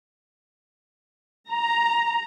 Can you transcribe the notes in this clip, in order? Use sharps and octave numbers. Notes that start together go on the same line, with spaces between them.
A#5